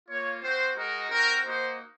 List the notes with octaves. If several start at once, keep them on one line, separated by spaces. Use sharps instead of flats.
A#3 F4 C#5
C4 F#4 C5
G#3 D#4 F#4 A#4
C4 F#4 A#4
A#3 D#4 F#4 C5